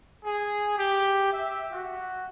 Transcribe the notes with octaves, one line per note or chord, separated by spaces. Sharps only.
G#4
G4
E5
F#4